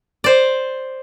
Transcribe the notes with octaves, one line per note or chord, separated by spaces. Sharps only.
C5 D5